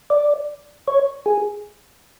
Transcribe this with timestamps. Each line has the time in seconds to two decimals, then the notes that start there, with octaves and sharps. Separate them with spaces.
0.10 D5
0.88 C#5
1.26 G#4